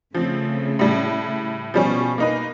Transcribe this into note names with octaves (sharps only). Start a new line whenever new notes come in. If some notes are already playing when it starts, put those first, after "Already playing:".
C#3 F3 A3 C4
A2 G3
B2 F3 G3 C#4
A#3 D#4 B4